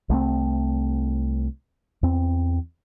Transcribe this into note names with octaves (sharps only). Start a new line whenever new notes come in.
C2 A3 C4
E2 C4